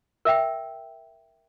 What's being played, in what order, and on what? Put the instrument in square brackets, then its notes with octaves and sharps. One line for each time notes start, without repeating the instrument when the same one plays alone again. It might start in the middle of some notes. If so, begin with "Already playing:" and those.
[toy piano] A#4 E5 G5